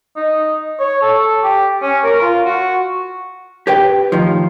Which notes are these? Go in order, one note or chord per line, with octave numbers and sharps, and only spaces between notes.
D#4
C#5
A4
G4
C#4
A#4
F4
F#4
G4 B4 G5
A2 D#3 F3